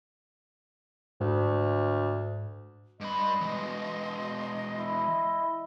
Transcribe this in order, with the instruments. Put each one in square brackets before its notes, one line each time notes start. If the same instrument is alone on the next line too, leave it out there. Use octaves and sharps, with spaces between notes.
[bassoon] D2 [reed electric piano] G#2
[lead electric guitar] G2 B5 [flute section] D#5 C6
[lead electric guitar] E3 G#3
[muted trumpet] E4